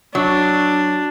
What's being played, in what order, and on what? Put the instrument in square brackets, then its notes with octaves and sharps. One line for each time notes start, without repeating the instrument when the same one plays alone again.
[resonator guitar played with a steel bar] F#3 [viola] D4